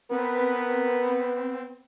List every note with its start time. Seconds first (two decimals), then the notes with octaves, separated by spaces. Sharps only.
0.11 B3 C4 A#4 B4